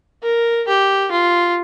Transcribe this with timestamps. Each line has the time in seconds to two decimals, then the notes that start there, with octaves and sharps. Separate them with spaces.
0.23 A#4
0.68 G4
1.11 F4